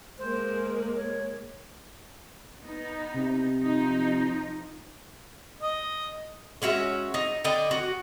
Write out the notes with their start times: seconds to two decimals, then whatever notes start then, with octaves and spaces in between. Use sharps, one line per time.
0.19 G#3 A#3 C5
0.96 C#5
2.62 B3 D#4
3.14 C3
3.61 F3 D#4
5.61 D#5
6.62 G#3 C#4 F#4 E5
7.14 D#4
7.44 D3 D5 D#5 G5
7.71 F#4